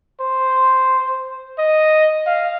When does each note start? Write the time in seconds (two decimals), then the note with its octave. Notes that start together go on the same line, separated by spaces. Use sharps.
0.21 C5
1.58 D#5
2.26 F5